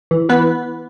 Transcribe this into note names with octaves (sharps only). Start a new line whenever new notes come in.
E3
E3 B3 B4